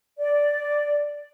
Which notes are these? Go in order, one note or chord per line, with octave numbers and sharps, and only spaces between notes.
D5